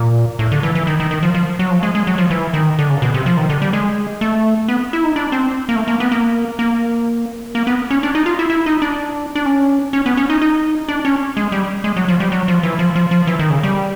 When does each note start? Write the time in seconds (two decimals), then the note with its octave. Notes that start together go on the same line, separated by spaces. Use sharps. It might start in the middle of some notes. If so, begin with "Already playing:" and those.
Already playing: A#2
0.39 A2
0.52 D3
0.63 E3
0.75 E3
0.87 D#3
1.00 D#3
1.11 D#3
1.23 F3
1.34 F3
1.59 F#3
1.71 F3
1.83 G#3
1.95 G#3
2.07 F#3
2.18 F3
2.30 E3
2.54 D#3
2.79 D3
2.90 C#3
3.02 B2
3.14 C3
3.26 F3
3.37 D#3
3.49 D3
3.62 G3
3.73 G#3
4.21 A3
4.68 B3
4.93 E4
5.04 D#4
5.16 D4
5.32 C4
5.69 A#3
5.76 A3
5.88 A#3
6.00 B3
6.11 A#3
6.59 A#3
7.55 A#3
7.67 B3
7.90 C#4
8.03 D4
8.15 D#4
8.26 F4
8.39 E4
8.50 E4
8.66 D#4
8.82 D4
9.35 D4
9.46 C#4
9.93 C#4
10.06 B3
10.17 C#4
10.30 D#4
10.42 D#4
10.88 D4
11.05 C#4
11.37 G#3
11.52 G3
11.84 G#3
11.96 F#3
12.08 F3
12.20 G3
12.32 F#3
12.48 F3
12.63 E3
12.79 F3
12.95 F3
13.11 F3
13.27 E3
13.39 D#3
13.50 C#3
13.63 G3